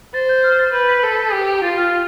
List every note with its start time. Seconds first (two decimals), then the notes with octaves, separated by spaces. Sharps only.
0.14 C5 A6
0.29 G6
0.44 F6
0.59 A6
0.73 B4 G6
0.89 B6
1.03 A4
1.33 G4
1.63 F4 A6
1.77 F6